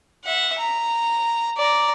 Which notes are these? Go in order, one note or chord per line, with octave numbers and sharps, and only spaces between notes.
E5 F#5
A#5
D5 A#5